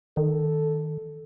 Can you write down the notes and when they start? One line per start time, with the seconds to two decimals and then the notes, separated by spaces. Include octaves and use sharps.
0.17 D#3 A4